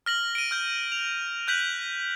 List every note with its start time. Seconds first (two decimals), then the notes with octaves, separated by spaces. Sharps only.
0.06 F6 A#6 F#7
0.35 D7 D#7
0.51 F6 G6
0.92 F7
1.48 F#6 G6 B6 F#7